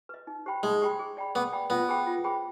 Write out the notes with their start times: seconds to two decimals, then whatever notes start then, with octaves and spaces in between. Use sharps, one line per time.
0.09 B4 D#5
0.27 D#4
0.46 G4 C5 G5 B5
0.63 G#3 D#4
0.82 G4 C5 G5 B5
0.99 G#4
1.17 D5 G5 B5
1.35 B3 G#4
1.53 D5 G5 B5
1.70 B3 F4
1.89 G#4 C5 G5 B5
2.07 F4
2.24 G#4 C5 G5 B5